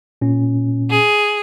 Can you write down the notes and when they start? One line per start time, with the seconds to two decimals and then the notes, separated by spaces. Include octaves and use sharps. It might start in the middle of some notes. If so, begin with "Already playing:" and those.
0.21 A#2 C#4
0.90 G#4